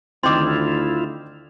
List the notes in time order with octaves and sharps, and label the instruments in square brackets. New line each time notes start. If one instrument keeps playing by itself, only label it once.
[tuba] D2 [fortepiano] D#3 C4 [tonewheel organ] E4 F4 [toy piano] C6 D6